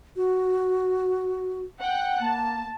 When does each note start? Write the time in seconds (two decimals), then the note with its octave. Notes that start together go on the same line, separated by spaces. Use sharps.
0.16 F#4
1.80 F#5 G5 F#6
2.20 A#3 A5